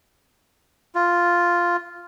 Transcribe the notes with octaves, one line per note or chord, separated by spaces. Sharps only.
F4